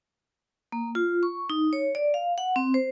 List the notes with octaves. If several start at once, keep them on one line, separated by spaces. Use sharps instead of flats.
A#3
F4
C#6
D#4
C#5
D5
F5
F#5
C4
C5